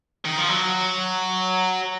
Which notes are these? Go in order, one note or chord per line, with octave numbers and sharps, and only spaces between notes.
D#3
F3
F#3